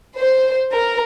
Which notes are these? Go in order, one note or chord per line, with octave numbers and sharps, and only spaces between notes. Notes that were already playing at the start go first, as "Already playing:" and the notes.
C5
A#4